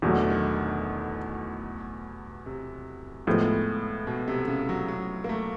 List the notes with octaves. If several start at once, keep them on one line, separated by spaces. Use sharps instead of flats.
E2 B2 D#3 F#3 A3
D3
D#3
C3
A2 F3 G#3 B3
B2
C3
C#3
F#3
F#3
A#3
A3